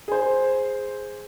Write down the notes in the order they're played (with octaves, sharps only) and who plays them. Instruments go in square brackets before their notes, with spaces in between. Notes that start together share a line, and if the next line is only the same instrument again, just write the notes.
[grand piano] G#4 C5